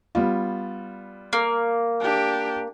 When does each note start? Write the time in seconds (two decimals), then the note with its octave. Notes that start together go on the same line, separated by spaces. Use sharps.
0.15 G3 B3 F4
1.33 A#3
2.01 D4 G4